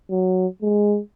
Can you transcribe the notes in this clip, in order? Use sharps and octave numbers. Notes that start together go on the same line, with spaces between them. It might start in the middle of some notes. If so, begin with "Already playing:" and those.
F#3
G#3